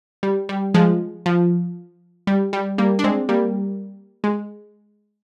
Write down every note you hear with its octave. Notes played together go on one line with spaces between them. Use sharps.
G3
G3
F3 G#3
F3
G3
G3
G3 A#3
D4
G#3 C4
G3 A#3
G#3